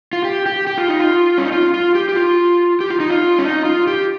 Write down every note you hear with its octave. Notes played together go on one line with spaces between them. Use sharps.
F4
G4
G4
G4
F4
D#4
F4
C#4
D#4
F4
F4
G4
G4
F4
G4
F4
D#4
F4
C#4
D#4
F4
G4